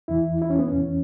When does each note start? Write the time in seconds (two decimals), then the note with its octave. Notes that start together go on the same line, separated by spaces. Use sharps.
0.08 E2 E3 E4
0.42 E4
0.50 C#4
0.59 B3
0.68 C#4
0.73 E2 E3